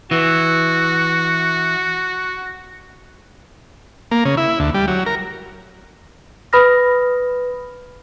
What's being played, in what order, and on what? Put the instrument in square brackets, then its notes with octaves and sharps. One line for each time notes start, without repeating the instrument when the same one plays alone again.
[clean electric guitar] E3 [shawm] F#4
[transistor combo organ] A#3
C#3
E4
D2
G3
F#3
A#4
[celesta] B4 B5 D#6 F6 A#6